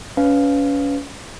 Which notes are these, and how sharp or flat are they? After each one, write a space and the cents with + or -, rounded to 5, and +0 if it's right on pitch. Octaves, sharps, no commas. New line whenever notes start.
C#4 +30 B4 +20 F5 +0